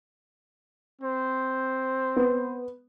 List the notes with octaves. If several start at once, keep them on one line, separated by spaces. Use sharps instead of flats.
C4 C5
B3